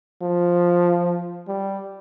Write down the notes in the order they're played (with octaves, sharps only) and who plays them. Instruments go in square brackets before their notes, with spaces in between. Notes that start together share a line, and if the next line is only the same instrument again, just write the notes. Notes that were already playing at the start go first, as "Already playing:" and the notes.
[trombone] F3
G3